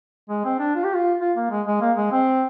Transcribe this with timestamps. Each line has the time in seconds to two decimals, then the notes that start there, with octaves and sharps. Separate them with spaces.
0.29 G#3
0.45 C4
0.59 D4
0.75 F4
0.84 G4
0.94 F4
1.20 F4
1.36 A#3
1.50 G#3
1.66 G#3
1.81 A#3
1.97 G#3
2.11 C4